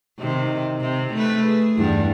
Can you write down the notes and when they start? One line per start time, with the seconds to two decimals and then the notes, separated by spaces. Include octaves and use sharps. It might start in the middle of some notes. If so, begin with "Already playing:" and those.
0.19 C3 D#3
0.81 C3
1.14 A3 B4
1.47 G#4
1.76 E2 G2